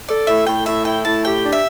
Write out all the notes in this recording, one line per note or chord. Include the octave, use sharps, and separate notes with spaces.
A4 D5
A2 E5
A2 G5
A2 E5
E4 G5
A2 A5
G4 G5
D4
E5